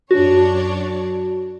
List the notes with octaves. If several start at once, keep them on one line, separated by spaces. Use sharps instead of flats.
F#2 D4 F#4 C#5